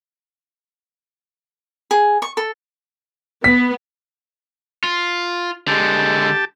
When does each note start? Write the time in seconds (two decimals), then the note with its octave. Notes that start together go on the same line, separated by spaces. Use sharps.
1.91 G#4
2.22 C#6
2.37 A4
3.44 B3 B6
4.84 F4
5.68 D3 G#3 G4 A5